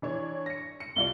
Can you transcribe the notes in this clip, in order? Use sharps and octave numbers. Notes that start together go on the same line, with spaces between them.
E3 D4 C#5
A#6 C#7
C#7
C2 F4 D5 G7